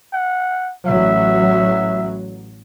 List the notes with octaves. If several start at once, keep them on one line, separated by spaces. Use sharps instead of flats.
F#5
A1 F#3 E5